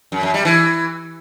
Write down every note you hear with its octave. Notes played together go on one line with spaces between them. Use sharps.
F#2
F#2
G3
E3